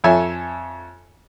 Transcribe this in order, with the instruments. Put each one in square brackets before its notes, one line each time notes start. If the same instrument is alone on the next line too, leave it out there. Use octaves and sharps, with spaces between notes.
[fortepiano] F2 A4 C#5 E5 G#5